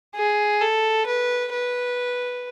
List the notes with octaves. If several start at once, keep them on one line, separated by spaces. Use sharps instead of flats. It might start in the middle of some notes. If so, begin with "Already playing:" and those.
G#4
A4
B4
B4